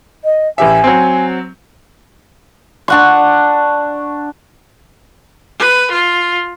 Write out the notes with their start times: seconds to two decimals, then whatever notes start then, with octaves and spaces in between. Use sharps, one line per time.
0.24 D#5
0.58 A1 G4 E5 G#5
0.84 F#3 C4
2.88 D4 F#5 C#6
5.59 B4
5.91 F4